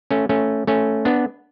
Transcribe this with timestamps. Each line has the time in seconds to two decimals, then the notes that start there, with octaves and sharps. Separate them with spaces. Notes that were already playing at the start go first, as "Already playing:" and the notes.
0.11 A3 C#4
0.29 A3 C#4
0.67 A3 C#4
1.05 B3 D4